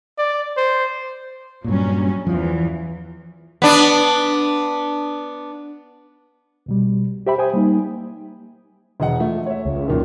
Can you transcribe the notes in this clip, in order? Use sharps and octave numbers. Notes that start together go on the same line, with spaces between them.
D5
C5
G2 A#2 F#3 G3 C#4
E2 E3 F3
B3 D4
C2 B2 G3
G4 C5 E5 G5 B5
C5 G5 G#5 D#6
G3 A#3 D#4
E1 D#5 F#5
F3 A3
C#5 E5
C#2
F#2 A#2 D#3